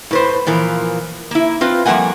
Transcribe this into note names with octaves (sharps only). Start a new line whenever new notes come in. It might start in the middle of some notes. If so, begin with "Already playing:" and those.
A2 B4 C5
A#2 E3 F3 A#4
A#3 E4
C4 F4 B4
F3 G3 A3 A#3 F#5 G#5